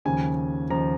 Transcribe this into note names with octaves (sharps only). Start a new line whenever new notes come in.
D#2 C#3 F3 G#5
D#2 C#3 F3 A#5